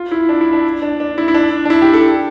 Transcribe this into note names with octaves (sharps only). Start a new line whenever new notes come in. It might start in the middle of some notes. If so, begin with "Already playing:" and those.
Already playing: F4
E4
D4
E4
D4
D4
D4
E4
E4
D4
D4
E4
G4
A4